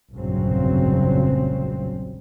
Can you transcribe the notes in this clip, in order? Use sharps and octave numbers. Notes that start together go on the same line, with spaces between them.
F1 A#1 G2 C#3 F#3 C4